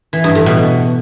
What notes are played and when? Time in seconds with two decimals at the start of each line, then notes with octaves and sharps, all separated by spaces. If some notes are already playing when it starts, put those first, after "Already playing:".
0.13 E3
0.24 G2
0.35 A2
0.46 B2